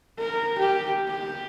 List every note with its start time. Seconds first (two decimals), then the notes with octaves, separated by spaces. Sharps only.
0.19 A#4
0.59 G4
1.08 G4